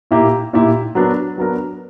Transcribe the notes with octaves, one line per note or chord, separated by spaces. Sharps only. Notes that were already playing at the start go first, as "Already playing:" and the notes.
A#2 A#3 E4 G4
A#2 A#3 E4 G4
F#3 B3 D4 A#4
F#3 B3 D4 A#4